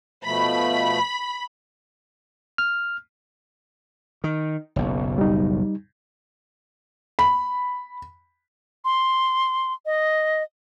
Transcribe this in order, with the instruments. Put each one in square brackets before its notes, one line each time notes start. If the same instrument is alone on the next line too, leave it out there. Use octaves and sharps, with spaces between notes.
[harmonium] B2 F3 A3 [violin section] B5
[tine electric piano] F6
[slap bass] D#3
F#1 B1
[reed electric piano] G3 D#4
[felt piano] B5
[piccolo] C6
D#5